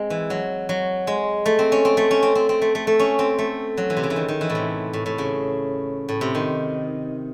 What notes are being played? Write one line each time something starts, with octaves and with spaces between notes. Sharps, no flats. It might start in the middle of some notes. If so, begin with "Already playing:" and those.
Already playing: G#3 C4
E3
F#3
F#3
G#3
A3
C4
C#4
C4
A3
C#4
C4
C4
C4
A3
A3
A3
C#4
C4
A3
F#3
E3
C3
C#3
E3
D#3
D#3
E3
A2
C3
A2
A2
C#3
A2
C3
D#3